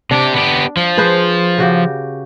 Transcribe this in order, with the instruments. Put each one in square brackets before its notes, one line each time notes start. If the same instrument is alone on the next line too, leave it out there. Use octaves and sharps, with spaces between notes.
[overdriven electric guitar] C3 G4 [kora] D4
[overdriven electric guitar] B3 G4
F3
[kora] G#4 B4 C5
C#3 F#4 G4